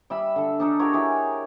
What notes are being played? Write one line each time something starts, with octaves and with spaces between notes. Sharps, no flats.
G3 E5 B5
D3 A4
D4 D#4 A4
F#4 G4 A#4 C#5
E4 G4 G#4